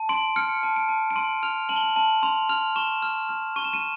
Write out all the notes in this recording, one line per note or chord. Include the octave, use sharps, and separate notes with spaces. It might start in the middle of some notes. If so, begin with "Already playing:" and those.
Already playing: A5
C6 D7
F6 C#7
A5
D7
A5
D7
C6 D#7
F6 F7
A5 F#7
G7
F#7
A5 F#7
C6 F7
F6 F7
C#6 E7
F6
F6
C#6 D#7
E7
D#7